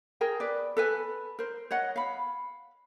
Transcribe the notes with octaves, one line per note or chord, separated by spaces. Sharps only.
G#4 A#4 G5
B4 D5
A4 B4 G#5
A#4 C5
C#5 D#5 F#5
F5 B5